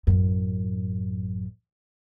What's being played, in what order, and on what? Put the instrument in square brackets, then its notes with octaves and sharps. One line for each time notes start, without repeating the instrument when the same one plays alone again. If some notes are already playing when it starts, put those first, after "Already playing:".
[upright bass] A1 F#2